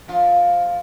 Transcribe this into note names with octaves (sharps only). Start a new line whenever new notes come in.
F2 F4